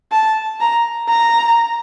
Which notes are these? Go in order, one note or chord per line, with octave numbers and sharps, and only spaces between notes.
A5
A#5
A#5